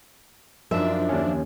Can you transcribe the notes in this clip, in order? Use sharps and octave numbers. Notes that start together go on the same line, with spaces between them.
F#2 F3 D4 D#4 E5
D#2 C#4